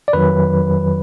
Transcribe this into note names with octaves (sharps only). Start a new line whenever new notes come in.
D5
F2 D#3 F#3 B4